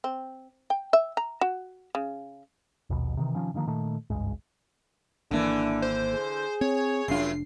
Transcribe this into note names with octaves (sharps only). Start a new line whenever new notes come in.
C4
G5
E5
A#5
F#4
C#3
A#1 D#2 B2
C3 D#3 E3
C3 D#3 F3 C#4
D3 D#3 F3 A#3
A#2 D#3 A3
G#1 C#2 G2 G#3
G#1 D3 E3 A#3 D4
C5
G#4
C4 C#5
F1 F#2 D4 F4 C7